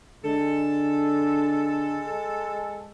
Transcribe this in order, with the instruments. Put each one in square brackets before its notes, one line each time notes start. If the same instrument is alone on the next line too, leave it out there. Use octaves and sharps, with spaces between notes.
[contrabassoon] D3 [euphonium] G#3 [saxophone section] A4